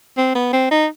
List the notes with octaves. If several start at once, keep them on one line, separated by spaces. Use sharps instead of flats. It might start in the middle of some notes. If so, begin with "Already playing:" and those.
C4
B3
C4
D#4